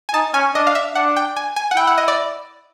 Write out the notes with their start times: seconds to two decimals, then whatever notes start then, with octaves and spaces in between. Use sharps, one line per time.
0.09 G#5
0.14 D#4 A5
0.34 C#4 G#5
0.55 D4 D#5
0.67 F5
0.75 E5
0.95 D4 F#5
1.16 G5
1.36 G#5
1.56 G#5
1.71 F#5
1.77 E4 G5
1.87 F#5
1.98 D#5
2.08 D5